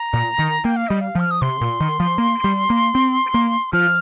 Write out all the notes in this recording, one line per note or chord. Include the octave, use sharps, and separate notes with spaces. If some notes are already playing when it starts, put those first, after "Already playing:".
Already playing: A#5
A#2
D#3
A#3 G5
F5
G3 D#5
F5
F3
F6
D#6
C3 C6
A#2
D#3
F3
A#3
G3
A#3
C4
A#3
F3 F6